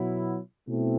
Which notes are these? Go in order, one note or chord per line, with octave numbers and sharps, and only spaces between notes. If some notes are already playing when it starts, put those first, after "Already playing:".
Already playing: B2 F#3 B3 E4
B2 A3 C4 E4